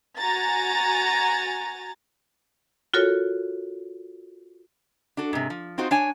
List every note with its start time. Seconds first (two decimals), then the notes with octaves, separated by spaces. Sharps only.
0.17 F#4 G#5 A#5 A6
2.94 F4 F#4 A4 A#4 C#5
5.17 D4 F#4 A4
5.33 G#2 C3
5.50 F3
5.78 C4 D#4 F4 F#4 C5
5.91 D4 C#5 G#5